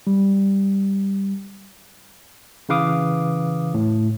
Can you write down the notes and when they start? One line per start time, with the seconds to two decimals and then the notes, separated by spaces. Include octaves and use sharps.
0.07 G3
2.69 C#3 E3 B4 F5 D6 D#6
3.74 A2